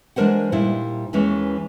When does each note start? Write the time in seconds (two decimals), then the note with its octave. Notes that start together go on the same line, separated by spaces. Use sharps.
0.16 E3 G#3 D4 A#4 C5 F#5
0.52 A#2 G3 D#4 E4 C5
1.13 D#2 D#3 E3 G#3 C#4